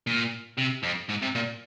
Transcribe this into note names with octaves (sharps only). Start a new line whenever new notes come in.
A#2
C3
F2
G#2
C3
A#2